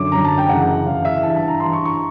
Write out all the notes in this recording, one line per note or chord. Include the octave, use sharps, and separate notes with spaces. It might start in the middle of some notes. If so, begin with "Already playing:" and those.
Already playing: F#2 D3 F#3 D6
F#2 D3 F#3 A#5
A5
G5
F#2 C#3 E3 F#5
F#2 C#3 E3 F5
E5
G2 E3 A5
A5
A#5
G2 E3 C6
C#6
C#6